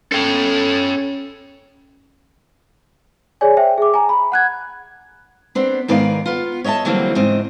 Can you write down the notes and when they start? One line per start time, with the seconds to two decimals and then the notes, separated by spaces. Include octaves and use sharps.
0.12 C#4 A4 G5
3.41 G#4 C#5 D5 G#5
3.57 C5 E5 G5
3.78 G#4 D6
3.94 G#5 A#5
4.09 B5
4.32 F#5 F#6 G#6
5.55 B3 C4 D4
5.88 G#2 D#3 B3 A#4 D5 F5
6.26 B3 F4
6.64 C#5 D#5 E5 G5 A5
6.85 D3 E3 F#3 G3 A#3 C4
7.15 E2 G#2 C#3 C4 D#5